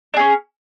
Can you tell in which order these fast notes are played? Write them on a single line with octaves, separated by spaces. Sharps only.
D4 G#4 C#4